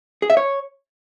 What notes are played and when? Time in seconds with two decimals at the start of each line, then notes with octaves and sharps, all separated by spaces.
0.22 G#4
0.30 E5
0.37 C#5